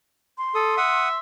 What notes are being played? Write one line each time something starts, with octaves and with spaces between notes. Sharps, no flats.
C6
A4 D#6
E5 F#5 D#6